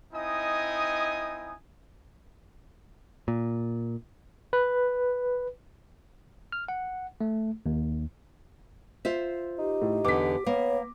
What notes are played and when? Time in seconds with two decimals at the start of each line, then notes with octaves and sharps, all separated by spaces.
0.13 C4 D#4 E4 D#5 G#5 D#6
3.28 A#2
4.53 B4
6.52 F6
6.68 F#5
7.21 A3
7.66 D#2
9.05 F4 C5 E5
9.58 D#4 G4
9.82 A2
10.05 E2 D3 D6 B6
10.46 A#3 B3 C#5